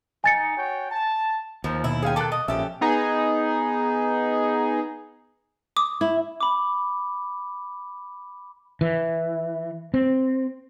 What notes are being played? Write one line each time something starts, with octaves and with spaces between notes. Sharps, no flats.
D#4 G#5 A6 C#7
F#4 C#5 G5
A5
D#2 F3
B2 E4
C#4 G#4 F5 G5 G#5
D#3 A4 D6 F#6
D#5
A#1 C#4 G4 A4 E5
B3 D#4 G#4
D6 D#6
E4
B5 D6
E3
C4